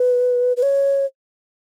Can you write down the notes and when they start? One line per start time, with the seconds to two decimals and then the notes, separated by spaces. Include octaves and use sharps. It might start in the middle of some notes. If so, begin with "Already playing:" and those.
Already playing: B4
0.57 B4
0.62 C#5